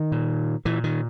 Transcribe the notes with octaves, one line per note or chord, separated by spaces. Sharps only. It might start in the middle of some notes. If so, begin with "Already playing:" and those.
Already playing: D#3
A#2
A#2 E3
D#3